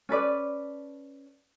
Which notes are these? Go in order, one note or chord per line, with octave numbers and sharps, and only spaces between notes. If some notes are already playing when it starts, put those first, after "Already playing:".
C#4 A4 B4 D5